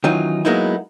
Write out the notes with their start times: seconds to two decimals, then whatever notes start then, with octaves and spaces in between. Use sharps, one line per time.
0.04 D#3 E3 F#3 C#4 D#4 F4
0.45 F#3 G#3 A#3 B3 D#4 E4